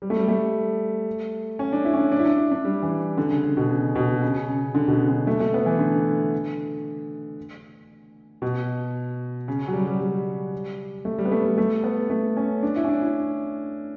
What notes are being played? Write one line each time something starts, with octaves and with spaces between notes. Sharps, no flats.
G3
A3
G3
A3
C#4
D4
E4
C#4
D4
D4
E4
D4
E4
D4
G3
E3
D3
C#3
C#3
B2
C#3
B2
C#3
C#3
D3
B2
C#3
D3
A3
A3
B3
E3
D3
B2
C#3
F#3
G3
G3
G3
A3
G3
B3
A3
G3
A3
B3
A3
C#4
D4
E4
C#4
D4
E4